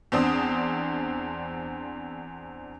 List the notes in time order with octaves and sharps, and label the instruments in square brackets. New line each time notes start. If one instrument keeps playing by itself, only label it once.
[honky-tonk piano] E2 C4 D4 D#6